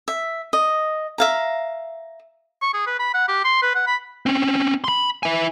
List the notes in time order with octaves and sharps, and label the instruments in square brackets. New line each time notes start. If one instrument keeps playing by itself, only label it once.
[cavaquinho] E5
D#5
E5 F5 A#5
[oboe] C#6
G#4
B4
B5
F#5
G4
C6
B4
F#5
B5
[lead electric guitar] C4 C#4
B5 C6
E4 G#5